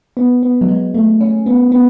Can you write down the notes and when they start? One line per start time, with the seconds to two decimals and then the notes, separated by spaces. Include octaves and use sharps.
0.17 B3
0.43 B3
0.61 F#3
0.68 G#3
0.94 A3
1.21 C#4
1.46 B3
1.72 B3